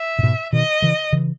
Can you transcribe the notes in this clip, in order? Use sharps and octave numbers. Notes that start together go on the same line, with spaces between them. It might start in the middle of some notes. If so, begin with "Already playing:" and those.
Already playing: E5
A#2
G#2 B2
B2 D#3 D#5
C#3 E3
C#3 E3